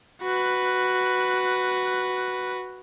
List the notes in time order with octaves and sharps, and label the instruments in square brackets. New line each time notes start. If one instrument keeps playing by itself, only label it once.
[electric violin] F#4 B4